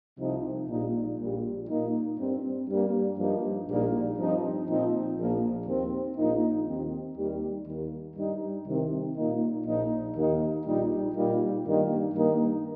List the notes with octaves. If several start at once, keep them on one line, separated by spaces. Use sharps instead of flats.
C2 C3 F3 D#4
A#1 A#2 G3 A#3 D#4
A#1 A#2 G3
A#2 A#3 D#4
G2 G3 C4
G2 G3 A#3
G2 F3 A#3 D#4
A#1 A#2 G3 A#3 D#4
G2 F3 C4 D#4
A#2 F3 C4 D#4
A#1 A#2 F3 A#3
D#2 D#3 C4
A#1 A#2 A#3 D#4
D#2 D#3 C4
D#2 D#3 G3
D#2 D#3 A#3
G2 G3 D#4
C2 C3 D#3 C4
A#2 A#3 D#4
A#1 A#2 F3 D#4
D#2 D#3 A#3 D#4
A#1 A#2 G3 D#4
A#2 G3 A#3 D#4
G2 D#3 G3 A#3 D#4
G2 D#3 A#3 D#4